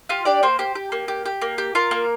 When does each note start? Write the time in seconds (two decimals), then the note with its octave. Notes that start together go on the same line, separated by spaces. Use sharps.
0.09 F4 G4 F5
0.25 D4 G4 D5
0.43 A#3 C5
0.59 G4 C5
0.75 G4
0.92 A#3
1.08 G4
1.25 G4
1.41 A#3
1.58 G4
1.75 F4 A#4
1.91 A#3